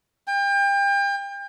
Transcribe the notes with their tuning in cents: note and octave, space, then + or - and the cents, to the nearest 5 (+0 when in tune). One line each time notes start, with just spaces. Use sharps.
G5 +35